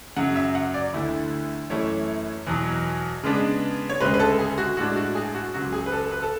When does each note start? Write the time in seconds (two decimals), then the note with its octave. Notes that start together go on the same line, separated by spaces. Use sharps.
0.17 F#2 C#3 F#3 F#5
0.36 E5
0.55 F#5
0.74 D5
0.93 D2 D3 A3 E4
1.70 F#2 E3 A3 E4 C#5
2.47 E2 B2 F#3
3.23 C#3 G#3 B3 D4
3.90 C#5
4.00 D2 C#3 G#3 B4
4.14 B4
4.20 A4
4.39 G#4
4.58 F#4
4.77 A2 G#3 D4 F#4
4.96 F#4
5.15 G#4
5.34 F#4
5.54 C#2 C#3 F#3 F#4
5.73 G#4
5.86 B4
5.92 A4
6.11 B4
6.22 A4